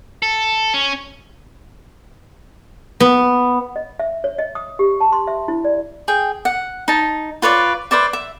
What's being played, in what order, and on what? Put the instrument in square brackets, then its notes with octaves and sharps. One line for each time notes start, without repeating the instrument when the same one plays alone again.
[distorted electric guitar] A4
C#4
[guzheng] B3
[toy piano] D#5
E5
C#5
D#5
D#6
G4
A5
C6
E5
E4
D5
[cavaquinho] G#4 G5
F#5
D#4 A5
F4 B4 C#5 D5
B4 C5 D5 E5
E5